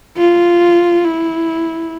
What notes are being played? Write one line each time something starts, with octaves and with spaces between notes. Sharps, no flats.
F4
E4